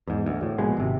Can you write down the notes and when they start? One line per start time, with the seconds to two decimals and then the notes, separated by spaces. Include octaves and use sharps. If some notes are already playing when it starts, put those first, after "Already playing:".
0.07 E2 G#2
0.26 D2
0.43 A2
0.58 D1 A#1 B2 G#3
0.77 G#1 C3